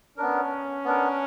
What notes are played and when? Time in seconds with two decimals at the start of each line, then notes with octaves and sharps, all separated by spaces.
0.17 B3 C#4 D4 A#4
0.85 B3 D4 A#4